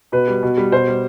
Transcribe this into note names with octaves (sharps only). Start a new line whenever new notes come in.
B2 B4
G3
B2
G3
B2 C5
G3